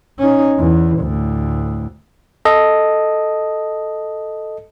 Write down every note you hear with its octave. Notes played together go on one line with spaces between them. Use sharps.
C#4 D#4
E2
D2 A2
A4 D#5